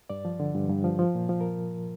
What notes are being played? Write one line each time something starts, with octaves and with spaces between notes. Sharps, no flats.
G2 D5
F3
D3
G2
G2
F3
F3
A#2
F3
A#4